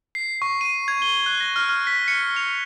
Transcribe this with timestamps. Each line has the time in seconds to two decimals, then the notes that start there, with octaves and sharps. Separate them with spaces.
0.15 C7
0.42 C#6
0.61 D#7
0.88 G#6
1.02 G7
1.26 F#6
1.40 A#6
1.56 F6
1.69 F6
1.87 B6
2.08 C#7
2.36 F7